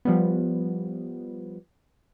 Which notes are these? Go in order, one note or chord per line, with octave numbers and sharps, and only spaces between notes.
F3 G3 B3